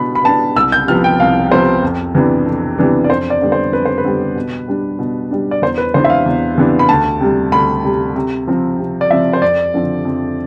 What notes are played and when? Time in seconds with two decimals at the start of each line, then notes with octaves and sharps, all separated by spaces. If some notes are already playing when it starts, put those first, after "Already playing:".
Already playing: B2 B3 D4 B5
0.15 B5
0.24 B3 D4 A5
0.55 C2 E6
0.72 G6
0.87 C3 F3 B3 F6
1.04 G5
1.20 C2 F5
1.51 C3 F3 B3 C5
1.82 F2
2.15 C3 E3 B3 D4
2.46 F2
2.78 C3 E3 B3 D4
3.04 D5
3.09 F2 C5
3.30 D5
3.41 D3 G3 B3
3.52 C5
3.72 F2 B4
3.85 C5
3.98 B4
4.05 D3 G3 B3
4.35 B2
4.68 G3 D4
4.99 B2
5.31 G3 D4
5.51 D5
5.62 E2 C5
5.78 B4
5.94 C3 E3 B3 D4 C5
6.04 E5
6.10 F5
6.26 E2
6.58 C3 E3 B3 D4
6.79 B5
6.89 D2 A5
7.20 C3 G3
7.52 D2 B5
7.84 C3 G3
8.16 C3
8.47 F3 C4
8.79 C3
9.01 D5
9.10 F3 C4 E5
9.33 C5
9.42 F2 D5
9.74 D3 F3 C4
10.05 F2